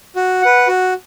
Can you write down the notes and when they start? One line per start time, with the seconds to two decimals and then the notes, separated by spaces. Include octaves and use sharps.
0.16 F#4
0.42 B4 F#5
0.68 F#4